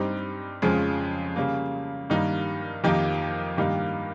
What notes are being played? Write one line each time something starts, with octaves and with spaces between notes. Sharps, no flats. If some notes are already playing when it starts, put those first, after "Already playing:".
Already playing: G2 G3 C4 D#4 G4
F2 C#3 F3 G#3
C#3 G3 A#3
G2 D#3 G3 A#3 D#4
F2 D#3 A#3 D#4 G4
G2 D#3 A#3 D#4 G4